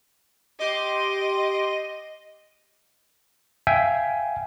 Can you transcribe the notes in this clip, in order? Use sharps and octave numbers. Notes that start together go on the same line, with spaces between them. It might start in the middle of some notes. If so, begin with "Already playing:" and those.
G4 D#5 C6 D6
E5 F5 G5 G#5